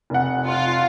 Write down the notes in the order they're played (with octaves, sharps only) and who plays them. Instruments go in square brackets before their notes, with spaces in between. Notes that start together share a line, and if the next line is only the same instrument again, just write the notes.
[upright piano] F1 F#5
[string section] F4